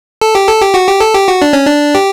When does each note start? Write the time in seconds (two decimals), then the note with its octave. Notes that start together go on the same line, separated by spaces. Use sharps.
0.21 A4
0.35 G4
0.48 A4
0.62 G4
0.74 F#4
0.87 G4
1.00 A4
1.15 G4
1.28 F#4
1.42 D4
1.53 C#4
1.66 D4
1.95 G4